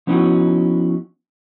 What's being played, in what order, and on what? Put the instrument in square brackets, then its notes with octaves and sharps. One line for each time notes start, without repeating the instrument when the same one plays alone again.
[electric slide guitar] F3 B3 C#4 D#4 E4 F#4